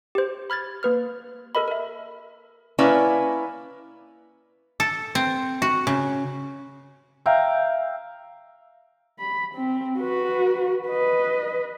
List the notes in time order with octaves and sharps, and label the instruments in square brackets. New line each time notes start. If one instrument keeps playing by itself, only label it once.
[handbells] G4 C5
B5 F6 G#6 A6
A#3 B4 F6
A4 A#4 D#5 B5
A#4 E5
[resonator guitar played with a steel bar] A#3 C#4 E4 B4 D5
[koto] A4
C4
F#4
C#3
[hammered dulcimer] E5 F5 G5 A#5
[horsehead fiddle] B5
C4
F#4 B4
B4 D#5